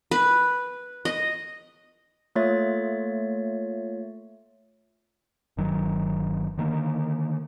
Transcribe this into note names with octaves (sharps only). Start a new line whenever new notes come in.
B4
D#5
A3 A#3 F4 C#5 E5 A6
G1 D#3 F#3
D3 D#3 A#3